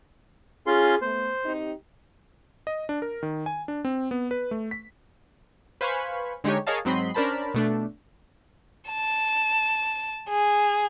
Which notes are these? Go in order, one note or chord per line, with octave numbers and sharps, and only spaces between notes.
C#4 F4 G#4 C6
A3 B3 C5
C4 D#4 G4
D#5
D4
A#4
D#3
G#5
D4
C4
B3
B4
A3
B6
B4 C5 F5 G#5 B5 C#6
D3 G#3 D#4 G4 C#5
G#4 A#4 C#5 D#5 F5 A5
G#2 F#3 C4 D#5 B5 C6
C#4 D4 A#4 C5 A5 B5
B2 A3 D4
A5
G#4